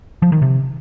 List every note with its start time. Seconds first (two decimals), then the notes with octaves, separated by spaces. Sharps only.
0.22 F3
0.32 D#3
0.42 C3